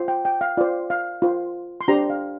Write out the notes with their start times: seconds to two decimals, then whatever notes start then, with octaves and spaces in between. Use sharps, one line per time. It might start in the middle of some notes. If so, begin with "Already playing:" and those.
Already playing: F4 C5
0.08 G5
0.25 G5
0.41 F5
0.57 F4 C5 D5
0.90 F5
1.22 F4 C5
1.81 C6
1.88 D4 G4 C5 A#5
2.10 F5